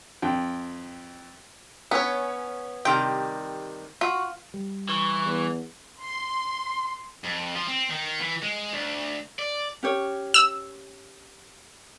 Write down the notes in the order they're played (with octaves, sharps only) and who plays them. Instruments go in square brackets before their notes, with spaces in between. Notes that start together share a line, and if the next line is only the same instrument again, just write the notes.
[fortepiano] F2 G5
[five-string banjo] B3 C#5 [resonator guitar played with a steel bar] C#4
[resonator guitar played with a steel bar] C3 D#3 G3 [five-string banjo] G5
[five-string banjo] F4 [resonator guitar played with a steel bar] F#4
[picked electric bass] G3
[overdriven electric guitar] E3 [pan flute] C#6
[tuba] E2
[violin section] C6
[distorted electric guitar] F2
F3
C4
D#3
E3
G#3
D2
D5
[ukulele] C#4 G4 C#5
[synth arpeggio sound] E6